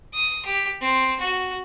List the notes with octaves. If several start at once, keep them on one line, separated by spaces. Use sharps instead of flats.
D#6
G4
C4
F#4